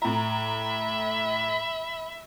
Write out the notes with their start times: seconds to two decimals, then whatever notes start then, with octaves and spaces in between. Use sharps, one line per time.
0.02 A2 E5 A#5 B5